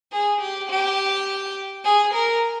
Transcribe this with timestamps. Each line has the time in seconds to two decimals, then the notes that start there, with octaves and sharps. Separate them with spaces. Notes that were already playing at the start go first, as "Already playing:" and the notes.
0.13 G#4
0.41 G4
0.70 G4
1.84 G#4
2.13 A#4